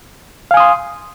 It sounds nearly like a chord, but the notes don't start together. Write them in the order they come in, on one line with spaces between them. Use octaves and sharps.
F5 G#5 D#6 C6